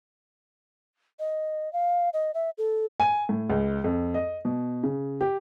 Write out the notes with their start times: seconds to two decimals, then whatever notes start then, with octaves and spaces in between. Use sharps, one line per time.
1.19 D#5
1.73 F5
2.13 D#5
2.34 E5
2.58 A4
3.00 G#5
3.29 A2
3.50 C#2
3.84 F2
4.14 D#5
4.45 B2
4.83 C#3
5.21 G4